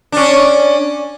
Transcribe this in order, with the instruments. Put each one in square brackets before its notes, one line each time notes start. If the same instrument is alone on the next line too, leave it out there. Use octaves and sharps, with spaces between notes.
[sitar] C#4 D4